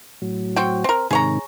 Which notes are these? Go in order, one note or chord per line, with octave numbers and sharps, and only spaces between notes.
A2 F#3
C4 F#4 G5
C4 A#4
G#2 C3 D#3 G#4 C#5 A#5